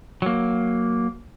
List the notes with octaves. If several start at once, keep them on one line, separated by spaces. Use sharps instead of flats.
F#3 A#3